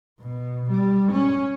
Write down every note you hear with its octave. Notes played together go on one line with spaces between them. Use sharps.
B2
G3
C#4